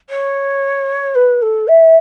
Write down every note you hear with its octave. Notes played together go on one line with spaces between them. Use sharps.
C#5
B4
A4
E5